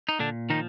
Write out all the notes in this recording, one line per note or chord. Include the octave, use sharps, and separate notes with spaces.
D#4
A#2 D3 D4
D#3 F3 D#4